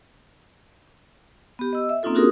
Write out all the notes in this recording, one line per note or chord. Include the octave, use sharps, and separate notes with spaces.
B3 G4
D#5 E6
E5
A#3 C4 C#4 D#4 F4 A4
D4 F4 F#4 G#4 A#4 D#6